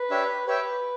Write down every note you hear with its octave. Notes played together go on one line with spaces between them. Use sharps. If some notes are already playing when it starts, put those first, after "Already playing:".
Already playing: B4
D4 G4 C#5 E5
G4 B4 C#5 E5 G5